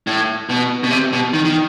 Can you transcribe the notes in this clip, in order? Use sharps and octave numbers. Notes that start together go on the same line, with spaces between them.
A2
B2
B2
C3
B2
D#3
D#3